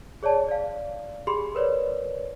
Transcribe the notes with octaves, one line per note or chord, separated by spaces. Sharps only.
G#4 C#5 D5 A5
D5 F5
G4 G#4 B5 C6
A#4 B4 C#5 D5